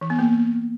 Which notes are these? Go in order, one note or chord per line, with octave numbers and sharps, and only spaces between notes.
E3
B3
A#3